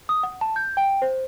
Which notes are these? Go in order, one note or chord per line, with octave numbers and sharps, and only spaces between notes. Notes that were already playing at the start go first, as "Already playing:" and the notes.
D#6
F#5
A5
G6
G5
C5